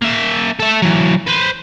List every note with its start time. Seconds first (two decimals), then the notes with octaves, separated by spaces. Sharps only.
0.02 A#3 E5
0.59 A4 E5
0.82 E3 F#3
1.27 B4 C5